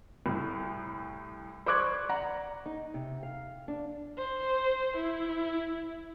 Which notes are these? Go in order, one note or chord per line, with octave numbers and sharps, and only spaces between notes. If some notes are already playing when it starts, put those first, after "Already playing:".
C2 A2
C5 D5 C#6 D6 F#6 G#6
D5 F#5 A#5
D#4
C3
F5
D4
C5
E4